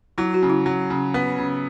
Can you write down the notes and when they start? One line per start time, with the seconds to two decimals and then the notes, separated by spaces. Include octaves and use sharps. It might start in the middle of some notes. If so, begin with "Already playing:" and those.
0.18 F#3 E4
0.34 F#4
0.43 C#3
0.50 E4
0.66 F#3
0.90 C#3
1.14 B3
1.38 C#3